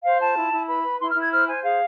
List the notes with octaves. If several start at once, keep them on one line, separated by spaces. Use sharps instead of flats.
C5 F5
F4 A5
E4
E4
B4 B5
B4
E4 C6
F6
E4
G#6
C5 F6
C5 G#5
G#4 F5